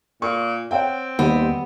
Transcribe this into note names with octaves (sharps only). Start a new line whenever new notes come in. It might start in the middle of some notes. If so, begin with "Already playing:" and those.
A#2 C#6
C4 C#5 F#5 G5
D#2 G3 B3